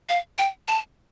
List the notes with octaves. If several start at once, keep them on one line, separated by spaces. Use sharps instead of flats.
F5
G5
A5